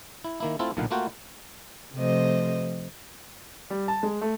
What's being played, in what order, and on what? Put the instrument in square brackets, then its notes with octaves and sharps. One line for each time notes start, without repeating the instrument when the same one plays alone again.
[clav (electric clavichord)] E4
D#3 A#3 E4
A3 C4 E4 F4 A4
B1 A#2 D3 D#4 F5 F#5
A3 A#3 F4 F#4 F#5 G5
[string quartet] C3 F3 A3 C5 D#5
[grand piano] G3
A5
G#3
A3